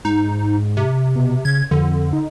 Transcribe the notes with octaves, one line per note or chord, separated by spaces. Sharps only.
G#2 D#4
C3
B2
C#3 G#6
F2 D3
D#4